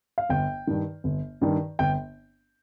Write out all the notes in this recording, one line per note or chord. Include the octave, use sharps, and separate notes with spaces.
F5
G1 G5
G2 D#3
G1
G2 D#3
G1 G5